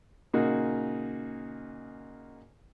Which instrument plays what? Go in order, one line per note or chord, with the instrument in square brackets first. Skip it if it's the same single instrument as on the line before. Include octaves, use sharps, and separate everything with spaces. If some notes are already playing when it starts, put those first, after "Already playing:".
[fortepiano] A#2 C#3 A#3 D#4 F#4 G#4